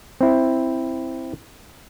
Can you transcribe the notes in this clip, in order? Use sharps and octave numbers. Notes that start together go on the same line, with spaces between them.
C4 E4